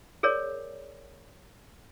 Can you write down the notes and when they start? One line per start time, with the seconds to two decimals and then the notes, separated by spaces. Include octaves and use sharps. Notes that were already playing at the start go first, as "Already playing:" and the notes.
0.23 G#4 A#4 C#5 D5